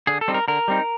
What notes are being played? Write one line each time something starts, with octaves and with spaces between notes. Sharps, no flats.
D3 G#4
A4
G3 C4 D#4
A#4
D3 A#4
G3 C4 D#4